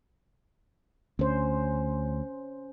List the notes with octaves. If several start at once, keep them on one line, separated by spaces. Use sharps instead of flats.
D2 C#4 C5